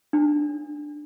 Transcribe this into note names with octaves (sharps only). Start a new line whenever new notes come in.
D4